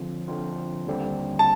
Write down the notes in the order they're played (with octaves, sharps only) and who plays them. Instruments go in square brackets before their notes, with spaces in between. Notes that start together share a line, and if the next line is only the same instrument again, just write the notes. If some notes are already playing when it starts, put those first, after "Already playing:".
Already playing: [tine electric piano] D3 F3 C4 F4
D3 F3 C4 F4
D#2 D3 G3 C4
[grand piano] A5